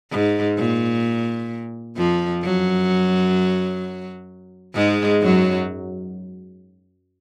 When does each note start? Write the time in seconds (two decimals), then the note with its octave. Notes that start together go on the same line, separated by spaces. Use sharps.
0.11 G#2
0.58 A#2
1.97 F2 F3
2.44 F#2 F#3
4.75 G#2 G#3
5.22 F#2 F#3